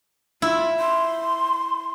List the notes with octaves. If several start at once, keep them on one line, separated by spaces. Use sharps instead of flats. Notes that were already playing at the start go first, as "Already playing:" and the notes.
E4 F4
C6